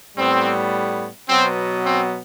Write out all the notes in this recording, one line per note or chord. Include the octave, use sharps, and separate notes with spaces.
A2 G3 B3 C4
B2 F#3 B3 C4
C4